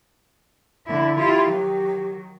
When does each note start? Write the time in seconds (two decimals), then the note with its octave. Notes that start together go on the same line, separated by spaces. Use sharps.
0.87 D3 E4
1.19 E4 F4 G4
1.50 D#3 F#3